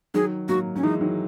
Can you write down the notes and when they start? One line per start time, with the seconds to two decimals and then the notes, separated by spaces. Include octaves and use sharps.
0.14 D#3 F#3 G#4
0.48 F#3 A#3 F#4
0.75 F#3 C#4
0.83 E3 G#3 D#4
1.00 D#3 F#3